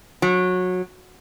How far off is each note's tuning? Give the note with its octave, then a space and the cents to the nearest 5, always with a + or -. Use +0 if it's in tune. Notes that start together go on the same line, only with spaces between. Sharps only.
F#3 -20